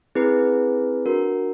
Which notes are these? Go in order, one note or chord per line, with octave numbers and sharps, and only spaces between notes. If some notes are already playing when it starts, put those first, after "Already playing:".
C4 E4 G#4 B4
D4 F#4 A#4